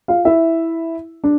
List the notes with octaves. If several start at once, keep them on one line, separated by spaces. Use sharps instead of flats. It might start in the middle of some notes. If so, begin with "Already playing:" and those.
F4 F5
E4 E5
D4